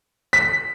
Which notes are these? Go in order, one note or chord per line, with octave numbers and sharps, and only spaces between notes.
B6